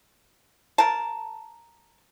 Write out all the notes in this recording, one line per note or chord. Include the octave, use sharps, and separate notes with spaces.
A#4 A5